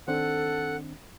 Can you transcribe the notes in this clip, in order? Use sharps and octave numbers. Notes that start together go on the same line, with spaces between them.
D#3 C4 D4 A4 F#5